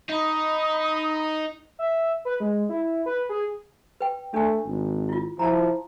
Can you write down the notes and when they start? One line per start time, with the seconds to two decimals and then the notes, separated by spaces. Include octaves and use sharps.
0.10 D#4 A#5 B5 D#6
1.79 E5
2.25 B4
2.40 G#3
2.69 E4
3.06 B4
3.29 G#4
4.01 B4 G5
4.34 A3 D4 G#5
4.66 G#1
5.09 E4 F4
5.39 F3 E4 A5 A#5